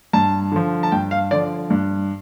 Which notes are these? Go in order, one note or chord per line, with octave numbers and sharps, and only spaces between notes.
G2 A5
D3 F3
A5
G2 G5
F5
D3 F3 D5
G2